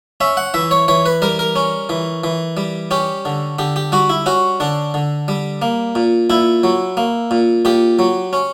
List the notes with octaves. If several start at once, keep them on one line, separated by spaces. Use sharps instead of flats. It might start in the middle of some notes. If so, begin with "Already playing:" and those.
C#4 E5
F#5
E3 E5
C#5
E3 C#5
B4
G3 A#4
A#4
C#4
E3
E3
G3
C#4 G4
D3
D3 G4
G4
G3 F#4
E4
C#4 F#4
D3 D4
D3
G3
A#3
A#2
A#2 E4
F#3
A#3
A#2
A#2 G4
F#3
C#4